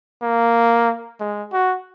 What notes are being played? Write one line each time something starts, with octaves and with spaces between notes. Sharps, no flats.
A#3
G#3
F#4